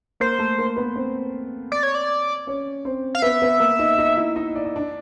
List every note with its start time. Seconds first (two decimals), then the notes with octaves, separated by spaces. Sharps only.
0.20 A#3 A#4 C5
0.39 A3 A4
0.58 A#3 A#4
0.76 B3 B4
0.96 C4 C5
1.72 D5
1.83 C#5
1.95 D5
2.47 C#4 C#5
2.85 C4 C5
3.15 F5
3.22 B3 B4 E5
3.42 B3 B4
3.60 A#3 A#4
3.79 D#4 D#5
3.98 D#4 D#5
4.17 E4 E5
4.36 D#4 D#5
4.55 D5
4.65 D#5
4.76 D4 D5